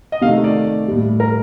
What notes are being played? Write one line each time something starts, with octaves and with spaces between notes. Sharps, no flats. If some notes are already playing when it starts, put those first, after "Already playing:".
D#5
C3 D#3 A3 F5
D#5
D5
A2 G3
A#4